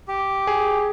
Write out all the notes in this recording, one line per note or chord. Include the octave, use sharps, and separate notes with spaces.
G4
G#4